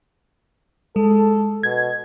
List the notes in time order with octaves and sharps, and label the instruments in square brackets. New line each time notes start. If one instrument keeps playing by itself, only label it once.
[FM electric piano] G#3 [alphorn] A4
[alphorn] B2 [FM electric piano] G#6